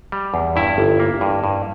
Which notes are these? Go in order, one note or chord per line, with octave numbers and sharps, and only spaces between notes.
G3
E2
G2 E4
G1
A#3
G2
G2